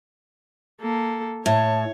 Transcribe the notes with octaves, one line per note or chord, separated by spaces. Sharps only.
A#3 A4
A2 C#5 A5